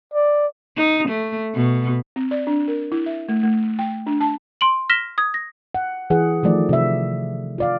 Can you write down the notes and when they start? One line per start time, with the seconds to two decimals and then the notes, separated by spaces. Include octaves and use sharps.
0.14 D5
0.77 D#4
1.09 A3
1.55 B2
2.16 C4
2.31 D5
2.47 D4
2.68 A#4
2.92 E4
3.06 E5
3.29 A3
3.43 A3
3.79 G5
4.07 D4
4.21 A5
4.61 C6 D7 F#7
4.90 F6 A#6 B6 E7 G7
5.18 D#6 G#6
5.34 A#6
5.75 F#5
6.10 E3 G#4 F#5
6.43 D#3 F3 A3 D5
6.69 C3 E5
7.58 F4 D5 F5